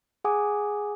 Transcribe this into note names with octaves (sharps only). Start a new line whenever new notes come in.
G#4 F#5 G#5 D6 D#6